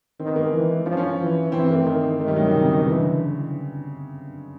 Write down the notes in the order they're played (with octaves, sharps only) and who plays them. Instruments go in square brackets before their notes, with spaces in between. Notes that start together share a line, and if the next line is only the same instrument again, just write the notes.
[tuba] D#3 [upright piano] C4
[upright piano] B3
A#3
G#3
[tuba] E3
[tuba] F3 [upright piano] C#4
[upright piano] C#4
[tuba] E3
[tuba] E3 [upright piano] C4
[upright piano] C4
A#3
A3
[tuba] D#3
[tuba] D#3 [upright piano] A3
[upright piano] G3
F#3
C#3
C3
C#3
B2
[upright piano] C#3 [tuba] E3
[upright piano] D3